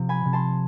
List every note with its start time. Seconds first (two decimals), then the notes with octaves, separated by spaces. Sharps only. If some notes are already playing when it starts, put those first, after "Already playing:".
Already playing: C3 F3
0.09 G#5 B5
0.25 C3
0.33 A5 C6